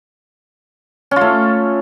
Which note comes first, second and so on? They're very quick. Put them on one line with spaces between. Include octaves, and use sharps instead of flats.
C#4 F4 A3